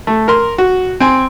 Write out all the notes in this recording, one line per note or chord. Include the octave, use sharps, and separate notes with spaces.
A3
A#4 C6
F#4
C4 G#5